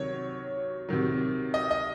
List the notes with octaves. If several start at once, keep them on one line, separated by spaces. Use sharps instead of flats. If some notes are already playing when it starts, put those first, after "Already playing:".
Already playing: C3 D#3 F#3 C#5
C3 D#3 F#3
D#5
D#5